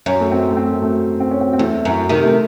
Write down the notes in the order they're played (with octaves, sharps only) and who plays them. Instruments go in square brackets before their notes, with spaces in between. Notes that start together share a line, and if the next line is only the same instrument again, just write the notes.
[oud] F#2 [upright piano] C#4
[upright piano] A3
C4
A3
C4
A3
C4
C#4
C4
C4
[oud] E2 [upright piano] A3
[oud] F#2
C3 D#3
[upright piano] A3